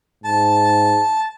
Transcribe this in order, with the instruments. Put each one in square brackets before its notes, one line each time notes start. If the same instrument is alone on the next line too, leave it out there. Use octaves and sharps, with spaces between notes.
[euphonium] G#2 [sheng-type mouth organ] A5